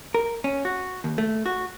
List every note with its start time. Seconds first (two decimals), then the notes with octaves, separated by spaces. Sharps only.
0.14 A#4
0.44 C#4
0.65 F#4
1.04 D#2
1.18 A3
1.46 F#4